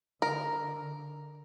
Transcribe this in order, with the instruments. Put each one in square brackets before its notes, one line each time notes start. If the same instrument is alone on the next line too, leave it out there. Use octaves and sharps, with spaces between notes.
[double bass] D3 [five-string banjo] A#4